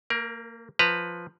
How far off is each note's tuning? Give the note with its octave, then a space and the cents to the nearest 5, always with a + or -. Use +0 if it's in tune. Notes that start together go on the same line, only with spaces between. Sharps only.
A#3 -25 A#4 +25
F3 +0 B4 +0 A#5 -20